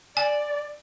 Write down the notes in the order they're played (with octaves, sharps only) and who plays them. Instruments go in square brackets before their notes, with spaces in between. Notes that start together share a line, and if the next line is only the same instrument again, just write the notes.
[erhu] D5 [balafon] G#5